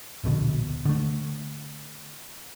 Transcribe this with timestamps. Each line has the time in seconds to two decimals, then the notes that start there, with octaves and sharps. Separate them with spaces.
0.24 D1 A#1 B2 D3
0.85 D3 A3